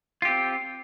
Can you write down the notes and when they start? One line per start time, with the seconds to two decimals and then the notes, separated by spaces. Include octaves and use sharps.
0.22 F4
0.25 G4
0.28 C4